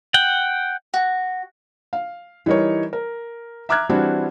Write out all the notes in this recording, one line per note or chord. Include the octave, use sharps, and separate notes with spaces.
F#5 G5
F#4
F5
E3 G3 D#4 A#4 C#5
A#4
E5 A#5 D6 F6 F#6 G#6
E3 G3 C4 D4 E4 F#4